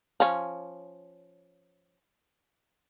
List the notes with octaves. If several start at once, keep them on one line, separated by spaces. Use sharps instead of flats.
F3 C#4